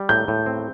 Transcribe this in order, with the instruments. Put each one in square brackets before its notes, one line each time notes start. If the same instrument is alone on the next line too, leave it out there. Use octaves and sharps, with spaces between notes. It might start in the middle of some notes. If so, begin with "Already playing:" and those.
Already playing: [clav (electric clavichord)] G3
[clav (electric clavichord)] A2 [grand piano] G6
[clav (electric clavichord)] A2
C4